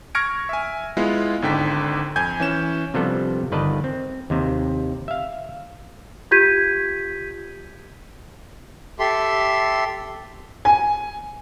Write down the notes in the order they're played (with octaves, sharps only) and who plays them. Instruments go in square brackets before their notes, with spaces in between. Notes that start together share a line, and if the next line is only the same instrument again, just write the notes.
[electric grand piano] C#6 F6 G#6 A#6 C#7 D7
E5 G#5
G#3 B3 E4 F4
G#1 G#2 D3 G5 B6
F2 G#5 G6 G#6
E3 C#4 E7
[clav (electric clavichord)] C3 F3 G3 B3 D4 A4
G1 D#3 B4 D5 D#5 A5
C4
D#2 C3
E5 F5
[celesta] F4 G4 G6 G#6 B6 D#7
[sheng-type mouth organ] G4 A4 E5 C6
[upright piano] G#5